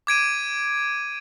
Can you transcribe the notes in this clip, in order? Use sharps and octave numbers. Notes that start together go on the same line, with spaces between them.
D6 G#6 D7 D#7